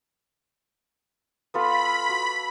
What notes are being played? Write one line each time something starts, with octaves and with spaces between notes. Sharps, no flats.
B3 F4 A4 B5
F#4